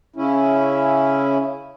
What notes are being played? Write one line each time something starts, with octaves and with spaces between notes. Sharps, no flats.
C#3 C#4 E4